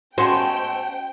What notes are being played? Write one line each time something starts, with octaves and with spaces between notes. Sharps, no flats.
G#3 A3 B3 C#4 F#4 C5 G5